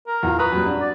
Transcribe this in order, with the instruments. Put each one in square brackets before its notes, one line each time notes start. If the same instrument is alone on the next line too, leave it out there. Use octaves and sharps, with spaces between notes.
[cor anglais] A#4
[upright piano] E2 F4
[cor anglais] B4 [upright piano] A#5 C#6 D#6
[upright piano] F#2 A#2 G3
D4 F#4
[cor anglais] D5